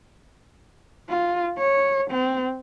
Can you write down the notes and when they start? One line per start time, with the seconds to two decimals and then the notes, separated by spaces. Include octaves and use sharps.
1.09 F4
1.58 C#5
2.10 C4